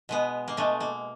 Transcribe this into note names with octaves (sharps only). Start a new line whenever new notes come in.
B2 G#3 B3
A#3
B2 G#3 A3
A#3